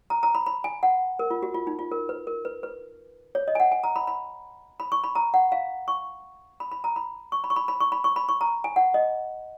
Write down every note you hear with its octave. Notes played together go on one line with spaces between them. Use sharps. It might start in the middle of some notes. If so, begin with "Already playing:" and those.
A#5
A#5
B5
B5
G#5
F#5
A#4
F4
F#4
F4
D#4
F4
A#4
B4
A#4
B4
B4
C#5
D#5
G#5
F#5
G#5
A#5
B5
B5
B5
C#6
B5
A#5
F#5
F5
C#6
B5
B5
A#5
B5
C#6
B5
C#6
B5
B5
C#6
B5
C#6
B5
C#6
A#5
G#5
F#5
D#5